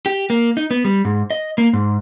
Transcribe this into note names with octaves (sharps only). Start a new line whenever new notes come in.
G4
A#3
D#4
B3
G3
G#2
D#5
A#3
G#2